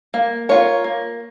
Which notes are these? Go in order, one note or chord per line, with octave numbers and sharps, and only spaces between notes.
A#3
F4 A#4 C#5
A#3